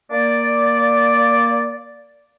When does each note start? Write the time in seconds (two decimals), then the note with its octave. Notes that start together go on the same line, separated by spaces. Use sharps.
0.12 A#3 D5